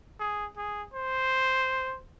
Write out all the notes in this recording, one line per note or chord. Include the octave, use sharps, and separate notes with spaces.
G#4
G#4
C5